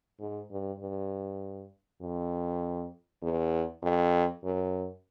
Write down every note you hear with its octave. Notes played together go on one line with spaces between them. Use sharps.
G#2
G2
G2
F2
E2
F2
F#2